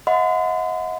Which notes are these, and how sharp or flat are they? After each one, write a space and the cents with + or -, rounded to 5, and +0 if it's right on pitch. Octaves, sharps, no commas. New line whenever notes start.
D#5 +40 F#5 -35 C6 -45